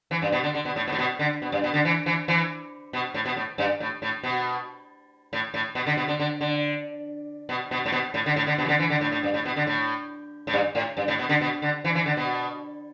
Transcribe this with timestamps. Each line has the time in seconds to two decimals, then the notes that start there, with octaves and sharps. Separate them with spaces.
0.11 E3
0.22 G2
0.32 B2
0.44 D3
0.55 D3
0.65 B2
0.76 A2
0.88 B2
0.92 A2
0.98 B2
1.19 D3
1.42 B2
1.52 G2
1.64 B2
1.74 D3
1.85 E3
2.06 E3
2.28 E3
2.93 B2
3.14 A2
3.26 B2
3.36 A2
3.58 G2
3.80 A2
4.02 A2
4.23 B2
5.33 A2
5.54 A2
5.75 B2
5.87 D3
5.97 B2
6.08 D3
6.20 D3
6.41 D3
7.49 B2
7.71 B2
7.86 A2
7.92 B2
8.14 A2
8.26 D3
8.36 A2
8.47 D3
8.58 B2
8.65 E3
8.69 D3
8.79 E3
8.90 D3
9.01 A2
9.12 A2
9.23 G2
9.34 A2
9.45 B2
9.56 D3
9.67 A2
10.47 A2
10.53 G2
10.75 A2
10.97 G2
11.08 A2
11.19 B2
11.29 D3
11.41 B2
11.62 D3
11.84 E3
11.95 E3
12.06 D3
12.17 B2